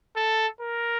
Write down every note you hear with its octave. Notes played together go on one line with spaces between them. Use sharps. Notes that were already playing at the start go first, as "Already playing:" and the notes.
A4
A#4